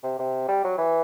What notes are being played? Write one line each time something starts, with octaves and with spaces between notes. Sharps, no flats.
C3
C3
G3
F#3
E3